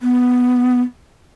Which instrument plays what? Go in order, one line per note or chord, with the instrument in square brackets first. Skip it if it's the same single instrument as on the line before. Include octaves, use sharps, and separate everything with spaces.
[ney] B3